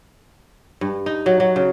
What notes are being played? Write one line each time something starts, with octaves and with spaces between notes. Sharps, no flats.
G2
D#4
F#3
F#3
C#3